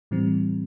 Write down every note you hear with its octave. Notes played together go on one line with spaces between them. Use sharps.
A2 E3 G3 C4